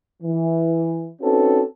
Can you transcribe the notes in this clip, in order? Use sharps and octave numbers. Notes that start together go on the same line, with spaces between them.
E3
C4 C#4 D#4 F#4 A4 B4